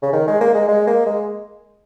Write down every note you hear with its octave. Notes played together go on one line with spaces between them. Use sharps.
C#3
D#3
G#3
A#3
G#3
G#3
A#3
G#3